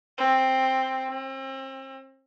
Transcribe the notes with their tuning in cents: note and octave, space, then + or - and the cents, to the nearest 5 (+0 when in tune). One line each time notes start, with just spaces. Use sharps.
C4 +5
C4 +35